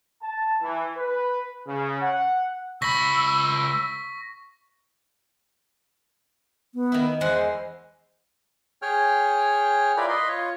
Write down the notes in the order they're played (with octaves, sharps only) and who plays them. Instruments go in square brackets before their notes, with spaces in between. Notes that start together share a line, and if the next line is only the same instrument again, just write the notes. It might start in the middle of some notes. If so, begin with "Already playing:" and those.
[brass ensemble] A5
E3
B4
C#3
F#5
[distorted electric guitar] C#2 B5 [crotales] C#6 A#6 B6 [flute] E6
[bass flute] B3
[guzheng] D#3 E4
[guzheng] E2 G#3 F#5 [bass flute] C5
[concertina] G#4 C#5 G5 F6
E4 F4 A#4 B4 D5
B4 D#5 C6
F4 C#5